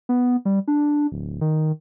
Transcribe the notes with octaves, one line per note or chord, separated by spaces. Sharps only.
B3
G3
D4
D1
D#3